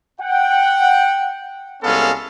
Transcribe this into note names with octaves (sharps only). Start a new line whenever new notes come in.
F#5 G5
C2 G#3 B3 C#4 A4 F5